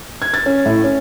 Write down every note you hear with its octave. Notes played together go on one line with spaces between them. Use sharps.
G#6
A6
C#4
A2
C#4